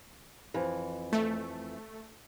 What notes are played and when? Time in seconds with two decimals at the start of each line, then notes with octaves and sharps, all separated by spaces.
0.54 F2 E3
1.13 A3